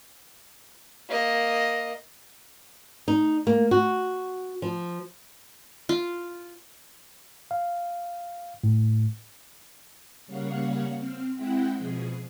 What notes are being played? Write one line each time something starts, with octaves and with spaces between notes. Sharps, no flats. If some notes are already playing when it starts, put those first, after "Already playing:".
A#3 D#5
D#4
A#3
F#4
F3
F4
F5
A2
C#3 G3 A#3 C#5 F5 F#5
C4 F6
G#3 C4 E4 E5 F#5 G5
B2 F3 G#4